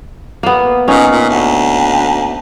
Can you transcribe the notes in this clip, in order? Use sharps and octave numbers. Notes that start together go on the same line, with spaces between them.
A#3 B3
A#2 C#4 D#4
A#2
D2